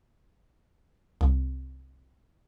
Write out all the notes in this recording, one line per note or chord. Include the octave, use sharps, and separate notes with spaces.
C2